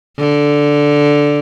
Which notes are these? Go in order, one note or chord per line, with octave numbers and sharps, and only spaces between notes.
D3